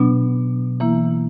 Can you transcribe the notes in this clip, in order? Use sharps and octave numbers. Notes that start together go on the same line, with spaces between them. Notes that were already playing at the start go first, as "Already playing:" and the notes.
Already playing: B2 F#3 B3 D4
E3 A#3 E4